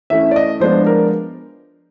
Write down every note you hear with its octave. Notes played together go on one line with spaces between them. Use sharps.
E3 A3 C#4 E5
D5
D#5
F3 G#3 B3 D4 C5
A#4